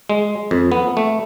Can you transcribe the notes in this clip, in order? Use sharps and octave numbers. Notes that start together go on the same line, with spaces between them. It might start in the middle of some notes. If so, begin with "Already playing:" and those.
G#3
F2
B3
A3